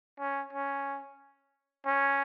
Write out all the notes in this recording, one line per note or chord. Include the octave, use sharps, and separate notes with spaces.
C#4
C#4
C#4